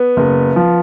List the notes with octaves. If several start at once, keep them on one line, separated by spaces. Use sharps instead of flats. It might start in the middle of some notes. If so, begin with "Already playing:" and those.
Already playing: B3
F#1
F3